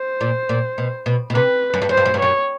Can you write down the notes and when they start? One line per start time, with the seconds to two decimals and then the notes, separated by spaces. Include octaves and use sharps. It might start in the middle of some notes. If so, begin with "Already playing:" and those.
Already playing: C5
0.21 A#2
0.49 A#2
0.78 B2
1.06 B2
1.30 B2
1.34 C3 B4
1.74 F#2
1.82 G2
1.89 F#2 C5
1.97 G2
2.06 F#2
2.14 G2
2.20 F#2 C#5